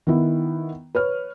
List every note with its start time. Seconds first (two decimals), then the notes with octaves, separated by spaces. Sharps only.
0.07 D#3 B3 E4
0.95 B4 C#5 F6